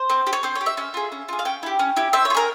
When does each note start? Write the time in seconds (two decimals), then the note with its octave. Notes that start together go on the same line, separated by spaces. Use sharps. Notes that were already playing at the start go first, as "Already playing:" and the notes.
Already playing: C5
0.10 C4
0.27 G4
0.33 C#5
0.43 C4 C5
0.55 C#5
0.61 G4
0.66 E5
0.77 C#4 E5
0.94 F4 G#4
1.12 C#4
1.29 F4 G#4
1.39 F5
1.45 C#4 G5
1.63 E4 G4
1.79 C#4
1.97 E4 G4
2.13 C4 E5
2.25 C#5
2.30 F4
2.35 G#4 A#4